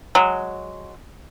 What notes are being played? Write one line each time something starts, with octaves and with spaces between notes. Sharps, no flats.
F#3 G#3